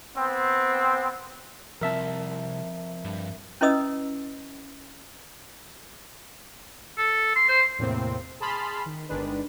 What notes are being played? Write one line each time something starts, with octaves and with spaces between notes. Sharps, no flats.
B3 C4
C2 F3 C4 A#4 E5 A5
G2
C#4 E4 B4 D#5 D#6 E6
A4
C6
C5
E2 A2 C3 A#3 C4
G#4 A5 B5 C6 F6
D#3
G1 D#3 G#3 D4 B4